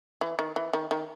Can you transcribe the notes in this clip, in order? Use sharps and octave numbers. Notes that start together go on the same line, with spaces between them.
E3
D#3
E3
D#3
D#3